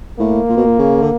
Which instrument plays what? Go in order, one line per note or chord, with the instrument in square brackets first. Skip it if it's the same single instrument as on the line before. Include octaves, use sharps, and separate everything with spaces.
[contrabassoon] A2 [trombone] A#3
[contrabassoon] A#2
B2
A#2
C#3
D3